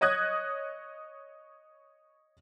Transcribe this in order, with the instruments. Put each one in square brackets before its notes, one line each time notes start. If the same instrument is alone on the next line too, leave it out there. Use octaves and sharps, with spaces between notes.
[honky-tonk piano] C#5 D#5 D#6 F#6 G#6